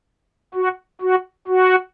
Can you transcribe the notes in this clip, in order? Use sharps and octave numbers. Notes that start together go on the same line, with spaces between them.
F#4
F#4
F#4